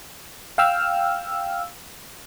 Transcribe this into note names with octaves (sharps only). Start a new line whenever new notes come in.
F5 G5 E6 F6